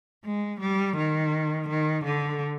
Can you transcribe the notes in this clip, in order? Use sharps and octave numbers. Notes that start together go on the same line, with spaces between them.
G#3
G3
D#3
D#3
D3